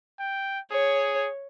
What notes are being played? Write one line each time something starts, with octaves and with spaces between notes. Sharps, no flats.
G5
G#4 C#5